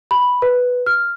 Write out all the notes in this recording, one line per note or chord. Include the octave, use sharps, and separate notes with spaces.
B5
B4
F6